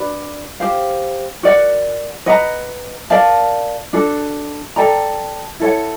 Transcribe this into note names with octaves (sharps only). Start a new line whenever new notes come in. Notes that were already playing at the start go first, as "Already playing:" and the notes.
Already playing: D4 F#4 B4 D5
G4 C5 F5
F#4 A#4 D5 F#5
B4 D#5 F#5 A#5
A#4 D5 F5 A5
D4 F#4 A4
A4 D5 G5 A#5
E4 A4 C#5 F#5